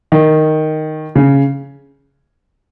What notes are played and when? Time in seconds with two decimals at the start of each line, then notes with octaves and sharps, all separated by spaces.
0.12 D#3
1.15 C#3